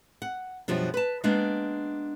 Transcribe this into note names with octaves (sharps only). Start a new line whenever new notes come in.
F#5
F#2 B2 F3 G3 D4
B4 A5
G#3 A#3 B3 D4